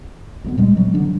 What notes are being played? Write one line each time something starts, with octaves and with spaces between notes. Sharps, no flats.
D2 G#3 B3
A#2 G3 G#3 C#4
F#3
D3 D4